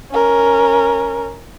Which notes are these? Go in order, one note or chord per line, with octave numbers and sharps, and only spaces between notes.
C#4 A#4